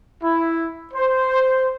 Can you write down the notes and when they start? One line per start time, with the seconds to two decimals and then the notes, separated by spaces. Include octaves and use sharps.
0.22 E4
0.93 C5